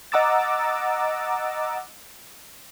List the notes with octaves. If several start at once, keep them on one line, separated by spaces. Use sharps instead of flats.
D#5 F#5 A#5 D6 E6 A6